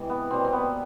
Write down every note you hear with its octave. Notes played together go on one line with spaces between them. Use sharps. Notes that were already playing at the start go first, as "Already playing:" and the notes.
Already playing: C3 E3 G#3
B3
B2 G3 A#3 C4
C4
B3